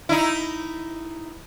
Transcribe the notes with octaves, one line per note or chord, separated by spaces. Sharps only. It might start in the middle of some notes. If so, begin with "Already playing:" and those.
D#4 E4